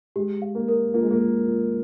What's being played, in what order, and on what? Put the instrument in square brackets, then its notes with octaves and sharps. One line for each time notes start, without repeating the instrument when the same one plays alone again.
[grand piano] G#3 [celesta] G4
[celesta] F5
[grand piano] A#3
[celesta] A#4
[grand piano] A#3 [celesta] F4
[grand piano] G#3
A#3
[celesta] F4
F4